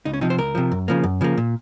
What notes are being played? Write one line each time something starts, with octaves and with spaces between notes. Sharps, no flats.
C#2 D#4
C#4
C3 F3 D#4
C5
C#2 A#4
C3 F3
F#2
C#3 F3 A#3
F#2
C#3 F3 A#3
A#2